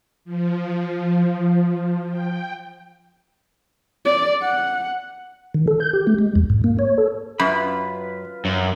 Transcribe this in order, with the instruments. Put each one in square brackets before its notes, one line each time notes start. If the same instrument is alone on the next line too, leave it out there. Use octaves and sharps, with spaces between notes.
[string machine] F3
G5
[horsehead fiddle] D5
F#5
[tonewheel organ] D#3
A4
G6
G4
A3
G#3
E2
G#2
A#3
C#5
A4
[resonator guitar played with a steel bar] F#2 [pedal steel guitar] F4 B4 B5
[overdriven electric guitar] F#2